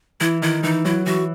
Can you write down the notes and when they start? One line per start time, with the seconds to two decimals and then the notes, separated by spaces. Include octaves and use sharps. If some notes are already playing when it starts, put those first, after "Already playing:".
0.20 E3 E4
0.42 D#3 E4
0.63 E3 D#4
0.85 F#3 E4
1.06 E3 F#4